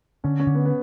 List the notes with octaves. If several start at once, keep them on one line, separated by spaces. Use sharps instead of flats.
D3 C#4
C#4
D3
B3
B3